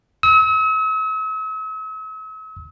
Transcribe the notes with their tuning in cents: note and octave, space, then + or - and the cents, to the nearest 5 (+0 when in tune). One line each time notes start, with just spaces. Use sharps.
E6 -45